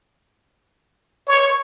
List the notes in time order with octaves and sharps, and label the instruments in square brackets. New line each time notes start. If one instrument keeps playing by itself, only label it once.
[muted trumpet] C#5